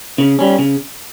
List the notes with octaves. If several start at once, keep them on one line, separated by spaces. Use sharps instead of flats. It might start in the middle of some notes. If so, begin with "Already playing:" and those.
C#3
G3 C#4
C#3